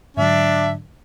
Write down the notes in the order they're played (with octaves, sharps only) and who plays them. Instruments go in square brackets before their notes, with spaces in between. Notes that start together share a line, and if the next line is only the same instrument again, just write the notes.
[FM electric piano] G#2 D3 F#3 [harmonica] D4 [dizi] E5